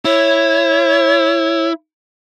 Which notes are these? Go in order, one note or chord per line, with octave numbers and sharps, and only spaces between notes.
E4 C#5